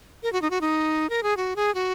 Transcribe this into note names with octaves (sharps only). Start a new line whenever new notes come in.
A#4
F#4
D#4
F#4
D#4
A#4
G#4
F#4
G#4
F#4